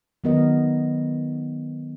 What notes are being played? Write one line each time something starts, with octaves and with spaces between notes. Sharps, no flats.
D#3 F#3 B3 A#4 D#5